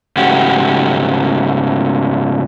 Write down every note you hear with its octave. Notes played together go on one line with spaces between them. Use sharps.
G#2 C#3 A3 F#4 G4